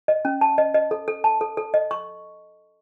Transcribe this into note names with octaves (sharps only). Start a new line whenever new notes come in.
D#5
C#4
A5
D#5
D#5
A4
A4
A5
A4
A4
D#5
C#6